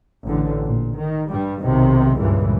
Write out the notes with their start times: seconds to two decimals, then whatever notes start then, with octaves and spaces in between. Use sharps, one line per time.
0.25 A1 D3
0.64 A#2
0.98 D#3
1.29 G2 G3
1.63 B1 C3 D#3
2.18 C#2 G2 A#2 E3